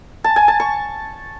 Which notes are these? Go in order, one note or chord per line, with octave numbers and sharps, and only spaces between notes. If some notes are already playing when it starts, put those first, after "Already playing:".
A5
G#5
A5
C#6